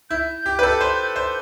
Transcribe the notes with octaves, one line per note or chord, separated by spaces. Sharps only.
E4 G6
G4
B4
A4
C5
C5